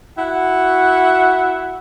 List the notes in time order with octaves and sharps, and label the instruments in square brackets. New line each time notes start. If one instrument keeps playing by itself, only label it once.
[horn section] E4 F#4 E5 F#5